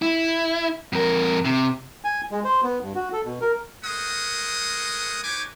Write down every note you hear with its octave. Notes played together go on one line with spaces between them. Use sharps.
E4
F2 A#4
C3
G#5
G#3
C5
B3
G2
F#4
A4
B2
A#4
G#3 A3 A#4 C5 F#5 D#6
D#4 G4 B4 C#5 G#5 D6